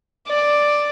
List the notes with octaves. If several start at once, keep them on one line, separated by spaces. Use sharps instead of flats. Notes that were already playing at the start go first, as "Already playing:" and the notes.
D5